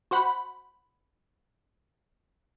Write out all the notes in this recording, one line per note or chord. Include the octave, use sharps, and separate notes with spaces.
F#4 C5 F#5 B5